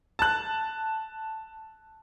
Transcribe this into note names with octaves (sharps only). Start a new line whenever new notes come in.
A5 F#6